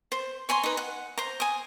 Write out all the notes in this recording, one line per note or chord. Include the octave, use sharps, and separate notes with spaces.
C5
C#5 G#5 A#5 C6
D#4 B4
F#5
C5 A#5
G#5 D#6